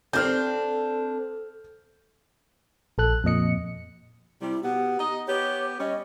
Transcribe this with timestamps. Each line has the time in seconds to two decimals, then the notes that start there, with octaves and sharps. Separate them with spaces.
0.13 C4 D4 A4 C5 F6 G6
2.98 A#1 A4 F#6
3.24 F2 A#2 D#5 C#7
4.41 C3 G3 E4
4.63 B2 B3 G4
4.99 D#4 D#5
5.28 B3 G4 C#5
5.80 G3 C#4 D#5